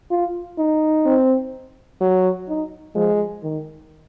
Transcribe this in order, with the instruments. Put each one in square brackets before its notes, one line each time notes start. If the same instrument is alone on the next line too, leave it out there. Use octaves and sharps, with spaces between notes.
[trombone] F4
D#4
[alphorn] C4
F#3
[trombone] D#4
[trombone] F3 [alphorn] G#3
[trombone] D#3